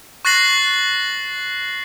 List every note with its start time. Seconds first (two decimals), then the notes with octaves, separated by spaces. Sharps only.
0.25 C#6 F#6 A6 A#6 C7 F#7